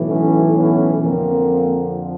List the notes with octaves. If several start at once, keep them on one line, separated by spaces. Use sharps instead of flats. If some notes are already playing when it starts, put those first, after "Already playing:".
Already playing: B1 A2 E3
B3 C#4
B3 C#4
F2 D3 F3 A#3 C4